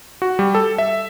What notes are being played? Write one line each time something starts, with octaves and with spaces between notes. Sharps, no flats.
F#4
G3
A4
E5